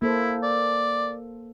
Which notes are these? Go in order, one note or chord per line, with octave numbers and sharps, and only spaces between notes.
A#3 E4 A4 C5
D5